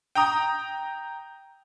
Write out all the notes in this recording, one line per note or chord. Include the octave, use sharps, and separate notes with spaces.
G5 A#5 D#6